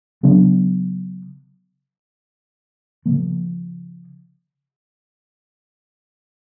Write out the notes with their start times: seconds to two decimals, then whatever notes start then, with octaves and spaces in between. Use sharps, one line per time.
0.23 C#3 F#3 B3 D4
3.06 C#3 F3 A#3